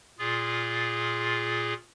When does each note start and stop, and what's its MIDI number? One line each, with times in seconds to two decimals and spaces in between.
0.19 1.74 46
0.19 1.74 65
0.19 1.74 68